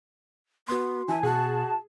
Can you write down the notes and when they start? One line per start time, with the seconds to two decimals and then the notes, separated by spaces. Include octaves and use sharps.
0.68 B3 F#4 C6
1.08 E3 E5 G#5 A5
1.23 B2 F#4 G#4 A5